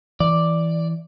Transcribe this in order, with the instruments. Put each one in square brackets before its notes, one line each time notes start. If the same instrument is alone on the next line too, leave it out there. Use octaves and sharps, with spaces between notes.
[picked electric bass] E3 [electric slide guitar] D5